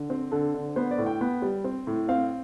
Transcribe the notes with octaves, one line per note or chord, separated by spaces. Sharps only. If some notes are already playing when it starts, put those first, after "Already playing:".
Already playing: D3
C4
D3 A4
D3
B3 C5
D5
A2
G5
B3
G3
C4
A2
C4 F5